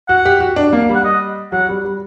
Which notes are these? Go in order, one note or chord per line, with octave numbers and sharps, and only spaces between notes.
F#4 F#5
G4
F#4
D4
A#3
G3
F#5
D#5
F#3 F#5
G3
G3